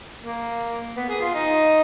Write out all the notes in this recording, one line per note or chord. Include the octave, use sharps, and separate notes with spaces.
A#3
B3
G#4
F4
D#4